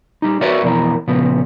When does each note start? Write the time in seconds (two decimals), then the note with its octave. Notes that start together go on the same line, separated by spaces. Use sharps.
0.22 G3 D#4
0.41 F#4 A#4 B4 C#5 D5 E5
0.63 F2 B2 E3 A#4
1.07 A#2 C#3 F3 B3